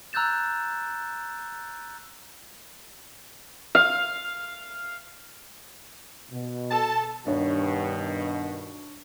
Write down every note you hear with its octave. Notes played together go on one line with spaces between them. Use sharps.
A#5 E6 F#6 G6 A6 E7
F5
B2
A4 A5
G2 B2 D#3 D4 C#5